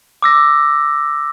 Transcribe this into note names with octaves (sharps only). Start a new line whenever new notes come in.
D6 E6 A#6